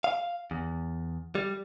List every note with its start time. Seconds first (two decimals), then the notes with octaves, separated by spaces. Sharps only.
0.04 F5
0.51 E2
1.35 G3